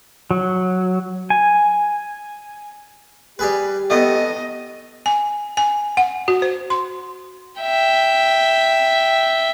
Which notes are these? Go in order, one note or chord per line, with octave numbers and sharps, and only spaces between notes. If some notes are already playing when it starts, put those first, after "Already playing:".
F#3
G#5
G3 G4 G#4 B4
A3 B3 D#5
G#5
G#5
F#5
F#4
C5
C6
E5 G5